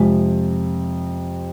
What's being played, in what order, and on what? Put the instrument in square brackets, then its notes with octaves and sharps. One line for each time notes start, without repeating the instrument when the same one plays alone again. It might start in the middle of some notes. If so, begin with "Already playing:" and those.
Already playing: [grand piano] F2 C3 F3 [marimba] G#3